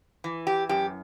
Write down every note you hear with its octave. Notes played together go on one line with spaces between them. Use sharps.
E3
G4
F#2 G4